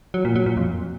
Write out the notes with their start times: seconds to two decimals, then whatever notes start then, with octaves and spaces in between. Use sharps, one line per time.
0.14 F#3
0.25 A#2
0.36 F#3
0.46 A#2
0.57 F2